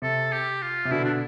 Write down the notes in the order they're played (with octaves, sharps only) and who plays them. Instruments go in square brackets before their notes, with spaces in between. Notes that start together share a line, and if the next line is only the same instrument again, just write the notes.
[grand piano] C3 [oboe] A4
[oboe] G4
F4
[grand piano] C3
[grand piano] B2 D3 [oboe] E4
[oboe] D4